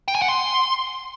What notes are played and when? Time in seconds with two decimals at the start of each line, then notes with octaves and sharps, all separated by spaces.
0.08 G5
0.15 G#5
0.22 F#5
0.29 C6